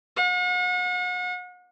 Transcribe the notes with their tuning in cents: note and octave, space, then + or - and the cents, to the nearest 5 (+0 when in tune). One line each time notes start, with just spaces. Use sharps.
F#5 -40